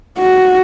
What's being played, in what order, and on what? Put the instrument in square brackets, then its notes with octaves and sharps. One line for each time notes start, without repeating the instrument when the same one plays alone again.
[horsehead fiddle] F#4